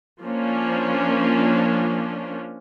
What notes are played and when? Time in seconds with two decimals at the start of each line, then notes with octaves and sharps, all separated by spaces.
0.22 F3 A#3 C#4 D4